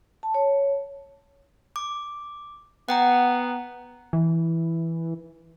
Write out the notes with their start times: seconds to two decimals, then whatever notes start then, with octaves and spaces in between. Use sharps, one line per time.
0.23 A5
0.34 C#5
1.76 D6
2.89 B3 F#5 G5 A#5
4.13 E3